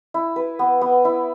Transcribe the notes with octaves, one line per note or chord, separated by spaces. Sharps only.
E4
B4
B3
B3
E4